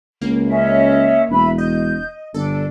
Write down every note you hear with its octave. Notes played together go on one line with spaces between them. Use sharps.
C#2 A#3
C#4 D#5 E5
E1 B4 E5 B5
D#5 G6
G1 D4 A4